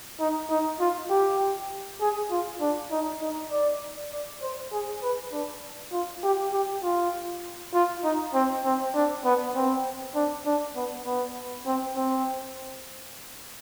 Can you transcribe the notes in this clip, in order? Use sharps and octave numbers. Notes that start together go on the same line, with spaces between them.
D#4
D#4
F4
G4
G#4
F4
D4
D#4
D#4
D5
D5
C5
G#4
B4
D4
F4
G4
G4
F4
F4
D#4
C4
C4
D4
B3
C4
D4
D4
B3
B3
C4
C4